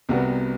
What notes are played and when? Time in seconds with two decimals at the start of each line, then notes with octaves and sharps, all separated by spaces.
0.09 C2 C3 G3 B3 F#4